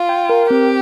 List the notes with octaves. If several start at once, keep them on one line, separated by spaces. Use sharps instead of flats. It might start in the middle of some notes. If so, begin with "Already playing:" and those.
Already playing: F4
G5
A#4
C4 G4